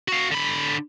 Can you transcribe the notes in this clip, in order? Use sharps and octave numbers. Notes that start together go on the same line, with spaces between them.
F#4 F5
D3 B5